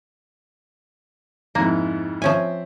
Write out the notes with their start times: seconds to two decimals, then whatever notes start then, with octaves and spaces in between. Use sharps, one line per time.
1.55 F2 G#2 A#3 E4
2.22 F3 C4 C#4 E5 G#5